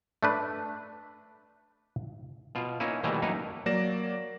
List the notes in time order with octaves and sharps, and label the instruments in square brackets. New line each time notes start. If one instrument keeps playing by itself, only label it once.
[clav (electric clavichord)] A3 D4 B4
B2 F4
A#3 C#4 D#4 E4
B2 D#3 E3 G3 A3 A#3
F#2 A#3 D#4 B4 C#5
[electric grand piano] F#3 A#3 D5 A#6 E7